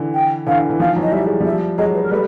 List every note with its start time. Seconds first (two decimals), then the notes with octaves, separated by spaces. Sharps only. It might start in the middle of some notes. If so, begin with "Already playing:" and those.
Already playing: D3 E3
0.14 G5
0.47 D3 E3 F5
0.70 E3
0.80 D#3 F3 F5
0.96 E3 F#3
1.02 D#5
1.12 G3 E5
1.26 G#3
1.40 F3 G3 E5
1.78 F#3 G#3 D#5
1.94 B4
2.03 A#4
2.11 G3 A3 B4